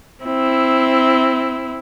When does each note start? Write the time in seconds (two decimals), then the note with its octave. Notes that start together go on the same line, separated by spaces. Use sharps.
0.25 C4 E4